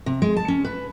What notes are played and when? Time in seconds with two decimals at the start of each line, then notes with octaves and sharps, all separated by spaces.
0.06 C3
0.22 G#3
0.37 A5
0.48 C#4
0.65 B4